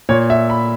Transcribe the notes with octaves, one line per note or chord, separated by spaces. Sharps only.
A#2 C#5
E5
B5